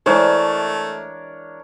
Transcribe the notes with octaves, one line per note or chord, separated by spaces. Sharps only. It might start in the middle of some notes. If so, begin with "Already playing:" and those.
E3 G#3 A3 D4 A#4 C5 C#5